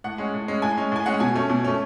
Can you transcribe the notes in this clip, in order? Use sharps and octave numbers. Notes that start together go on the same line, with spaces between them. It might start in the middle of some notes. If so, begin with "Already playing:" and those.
A2 F#5
G#3 C#4
A2
G#3 C#4
A2 G#5
G#3 C#4
A2 G#5
G#3 C#4 F#5
B2 G#5
A3 C#4
B2
A3 C#4